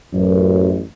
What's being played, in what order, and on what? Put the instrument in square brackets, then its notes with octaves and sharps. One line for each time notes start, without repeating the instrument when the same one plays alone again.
[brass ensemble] A1 F#2